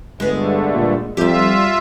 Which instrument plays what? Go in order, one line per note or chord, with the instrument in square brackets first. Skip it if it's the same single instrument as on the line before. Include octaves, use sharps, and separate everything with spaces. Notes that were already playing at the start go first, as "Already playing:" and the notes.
[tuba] G1 [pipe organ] G2 D3 A3 [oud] G#3 B3
[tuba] A#2
[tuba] F2 [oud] G3 G4 [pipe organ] F4 E5